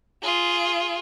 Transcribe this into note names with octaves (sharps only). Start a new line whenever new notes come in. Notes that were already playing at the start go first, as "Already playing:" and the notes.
F4 G#4